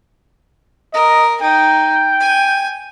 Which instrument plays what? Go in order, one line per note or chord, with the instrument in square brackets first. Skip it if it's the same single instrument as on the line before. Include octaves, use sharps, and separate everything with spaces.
[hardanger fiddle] A#4 [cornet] D#5
[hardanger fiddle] D#4 [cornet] G5
[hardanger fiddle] G#5